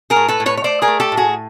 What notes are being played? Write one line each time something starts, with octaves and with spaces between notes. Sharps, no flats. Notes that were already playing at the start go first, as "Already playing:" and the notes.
G#4 A#4
A2
A4 B4
A2
B4 C#5
C#5
A3 C5 D5
G#4 A#4
A3
G4 A4
A2
F#4 G#4